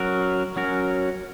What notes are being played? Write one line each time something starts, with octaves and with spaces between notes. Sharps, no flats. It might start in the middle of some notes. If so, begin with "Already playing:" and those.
Already playing: F#3 C#4 F#4 A#4
F#3 C#4 F#4 A#4